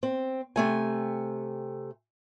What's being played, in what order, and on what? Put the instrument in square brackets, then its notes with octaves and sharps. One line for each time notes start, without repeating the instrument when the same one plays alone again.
[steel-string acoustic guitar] C4
C3 A3 G#5